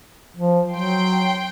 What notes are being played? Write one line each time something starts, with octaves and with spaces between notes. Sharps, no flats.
F3
F#3 G5 C6